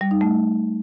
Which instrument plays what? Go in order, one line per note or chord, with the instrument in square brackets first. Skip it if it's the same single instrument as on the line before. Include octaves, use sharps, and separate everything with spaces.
[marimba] G3
D#4
A3